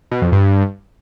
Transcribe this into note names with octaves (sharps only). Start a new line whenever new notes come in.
B2
F2
G2